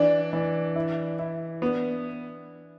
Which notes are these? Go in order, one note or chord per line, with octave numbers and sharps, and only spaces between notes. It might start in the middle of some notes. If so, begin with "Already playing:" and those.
Already playing: E3 D4
E3
E4
E4
B3 D4